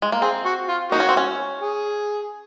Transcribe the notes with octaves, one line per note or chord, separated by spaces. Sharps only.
G#3
A#3
C4 G#4
F#4
F4
A#3 D#4 F#4
C#4
C4
C#4
G#4